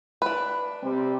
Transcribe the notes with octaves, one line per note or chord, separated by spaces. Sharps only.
D4 B4
C3 G3 C4